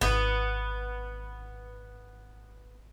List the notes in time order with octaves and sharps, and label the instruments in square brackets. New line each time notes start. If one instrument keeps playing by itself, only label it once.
[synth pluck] G#1 [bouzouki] B3